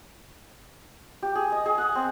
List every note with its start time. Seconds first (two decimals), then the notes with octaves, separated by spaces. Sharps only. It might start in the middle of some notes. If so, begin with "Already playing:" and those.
1.23 G4
1.35 G#4
1.52 D#5
1.66 G#4
1.78 F#5
1.95 C4